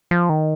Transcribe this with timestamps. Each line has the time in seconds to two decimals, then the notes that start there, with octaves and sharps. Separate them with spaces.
0.11 F3
0.29 D#3